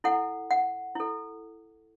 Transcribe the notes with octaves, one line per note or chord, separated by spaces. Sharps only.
E4 A4 F#5
F#5
E4 A4